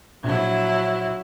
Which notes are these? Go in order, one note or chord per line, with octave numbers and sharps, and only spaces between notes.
A#1 F#3 E4